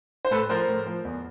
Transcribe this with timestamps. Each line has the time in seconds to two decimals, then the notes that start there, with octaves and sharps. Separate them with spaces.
0.25 C5
0.31 A2 A4 B4
0.49 F3 A#4 C5
0.68 A2
0.86 F3
1.05 E2